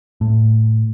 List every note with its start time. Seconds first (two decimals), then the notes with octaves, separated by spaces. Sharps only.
0.21 A2